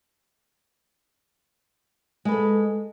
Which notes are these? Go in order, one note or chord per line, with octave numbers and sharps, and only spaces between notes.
G#3 A4 B4